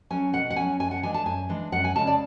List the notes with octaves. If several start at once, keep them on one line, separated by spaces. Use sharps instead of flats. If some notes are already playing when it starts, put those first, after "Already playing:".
F#3 C#4 G#5
B2 F#5
F#5
F#3 C#4 G#5
F#2 G#5
F#5
E3 G#3 D4 G#5
A5
F#2 G#5
E3 G#3 D4
F#2 F#5
G#5
C#3 G#3 A5
D5